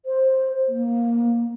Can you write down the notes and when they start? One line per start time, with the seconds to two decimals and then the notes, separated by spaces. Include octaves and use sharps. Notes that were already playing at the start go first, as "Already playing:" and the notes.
0.06 C5
0.69 A#3